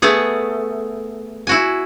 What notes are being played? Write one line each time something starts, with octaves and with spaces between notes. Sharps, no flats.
A3 B3 G#4
E4 F#4 G#5